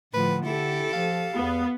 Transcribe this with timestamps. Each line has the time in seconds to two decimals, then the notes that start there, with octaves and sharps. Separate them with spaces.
0.14 A2 D3 F3 B4
0.46 E4 G4 A4
0.93 F3 F5
1.35 E2 B3